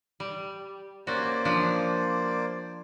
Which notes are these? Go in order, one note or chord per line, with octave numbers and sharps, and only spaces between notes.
G3
A#3 C#4 F#4 C5 D5
F3 D4